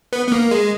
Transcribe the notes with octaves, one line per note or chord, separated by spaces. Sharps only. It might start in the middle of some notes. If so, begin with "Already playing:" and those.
B3
B3
A#3
G#3